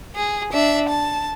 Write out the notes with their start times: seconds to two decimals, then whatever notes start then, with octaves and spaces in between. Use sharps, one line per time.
0.15 G#4
0.52 D4 E5
0.88 A5